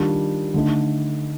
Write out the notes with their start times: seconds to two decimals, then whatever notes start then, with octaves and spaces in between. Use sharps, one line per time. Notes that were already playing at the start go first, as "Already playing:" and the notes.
Already playing: D#3 G3 D4 F4
0.54 D3 A3 D#4